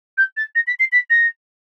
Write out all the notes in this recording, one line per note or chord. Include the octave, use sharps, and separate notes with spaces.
G6
A6
A#6
B6
C7
B6
A#6